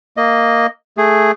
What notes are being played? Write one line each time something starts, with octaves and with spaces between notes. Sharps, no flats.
A#3 D#5
A3 G#4